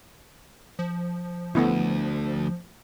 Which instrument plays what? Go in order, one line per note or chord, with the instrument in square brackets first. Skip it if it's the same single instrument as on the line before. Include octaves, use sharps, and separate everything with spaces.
[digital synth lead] F3
[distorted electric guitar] D2 [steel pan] A3 B3 E4